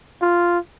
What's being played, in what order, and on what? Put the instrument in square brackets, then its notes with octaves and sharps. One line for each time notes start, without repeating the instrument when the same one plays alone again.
[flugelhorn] F4